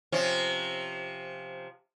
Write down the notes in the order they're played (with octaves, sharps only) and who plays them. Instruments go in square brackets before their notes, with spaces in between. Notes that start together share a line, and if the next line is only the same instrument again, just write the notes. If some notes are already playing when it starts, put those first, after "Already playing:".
[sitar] C3 F3 C#4